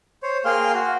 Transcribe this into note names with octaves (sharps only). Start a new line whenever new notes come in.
C5 C#5
A#3 G#4 F5 G5 C6 F6
F#4